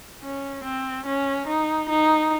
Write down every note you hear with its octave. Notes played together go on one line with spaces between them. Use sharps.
C#4
C4
C#4
D#4
D#4